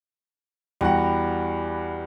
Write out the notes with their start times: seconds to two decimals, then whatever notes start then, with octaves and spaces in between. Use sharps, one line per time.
0.81 E2 G3 F#4 F#5 A#5